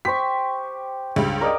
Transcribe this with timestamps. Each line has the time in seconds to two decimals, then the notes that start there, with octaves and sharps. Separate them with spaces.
0.05 G4 C5 C#6 B6
1.16 C#2 G2
1.41 A#4 D5 D#5